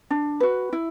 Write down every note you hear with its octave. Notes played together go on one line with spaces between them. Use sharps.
D4
F#4 B4
E4